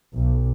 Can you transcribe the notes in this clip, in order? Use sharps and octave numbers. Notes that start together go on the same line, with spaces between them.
B1